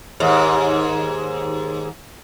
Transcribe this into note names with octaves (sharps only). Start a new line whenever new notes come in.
D#2 G#2